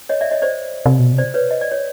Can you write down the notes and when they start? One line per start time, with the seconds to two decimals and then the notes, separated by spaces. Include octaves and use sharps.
0.09 C#5 D#5
0.21 D5 E5
0.31 C#5 D#5
0.42 C5 D5
0.86 C3
0.99 B2
1.13 C3
1.18 C5 D5
1.34 B4 C#5
1.51 D#5
1.61 D5
1.71 C#5